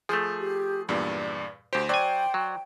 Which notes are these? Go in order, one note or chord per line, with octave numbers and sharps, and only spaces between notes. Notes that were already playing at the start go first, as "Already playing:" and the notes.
F3 A3 G#4 G6
G4
E2 G2 A#2 D5
D2 G4 C5
F#3 C5 D5 G5 G#5
F#3